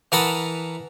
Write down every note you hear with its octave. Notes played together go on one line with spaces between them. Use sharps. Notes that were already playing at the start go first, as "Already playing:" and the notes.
E3 A#4 F#5 A5 B5 D#6